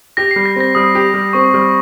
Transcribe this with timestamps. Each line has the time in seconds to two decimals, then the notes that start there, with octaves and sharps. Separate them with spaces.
0.17 G4 A#6
0.31 G3 C7
0.46 A#6
0.56 C4 A#6
0.75 G3 D#6
0.95 G4
1.14 G3
1.33 C4 C#6
1.54 G3